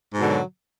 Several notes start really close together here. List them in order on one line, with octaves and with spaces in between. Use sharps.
G#2 B2 D3 F#3